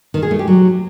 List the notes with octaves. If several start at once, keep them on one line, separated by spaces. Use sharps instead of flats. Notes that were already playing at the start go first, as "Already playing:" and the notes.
D#3
G#4
A3
G4
F#3